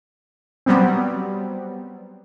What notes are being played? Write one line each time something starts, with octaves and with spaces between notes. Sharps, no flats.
F#3 G3 B3 C4